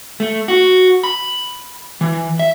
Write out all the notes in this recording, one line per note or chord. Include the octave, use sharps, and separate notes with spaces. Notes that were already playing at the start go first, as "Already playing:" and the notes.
A3
F#4
B5
E3
E5